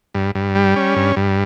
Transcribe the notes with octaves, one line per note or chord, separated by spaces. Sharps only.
G2
G2
G3
C#4
G2
G2